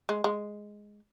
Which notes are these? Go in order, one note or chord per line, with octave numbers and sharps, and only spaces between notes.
G#3
G#3